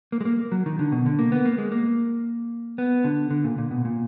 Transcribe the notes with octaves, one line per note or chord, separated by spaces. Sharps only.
A#3
G#3
A#3
F#3
D#3
D3
B2
D3
A#3
B3
A#3
G#3
A#3
B3
D3
D3
A#2
A#2
B2
A#2